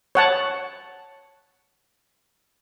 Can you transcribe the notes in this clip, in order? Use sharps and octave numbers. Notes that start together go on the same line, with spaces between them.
C#5 F#5 A5